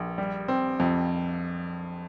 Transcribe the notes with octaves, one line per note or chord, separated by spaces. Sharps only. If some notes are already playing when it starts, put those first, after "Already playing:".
Already playing: A#1
G3
C4
F2